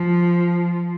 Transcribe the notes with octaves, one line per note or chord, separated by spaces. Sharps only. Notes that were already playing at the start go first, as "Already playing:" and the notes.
Already playing: F3